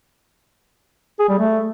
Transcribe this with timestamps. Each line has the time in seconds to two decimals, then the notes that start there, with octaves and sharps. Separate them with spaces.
1.19 G#4
1.29 G3
1.39 A3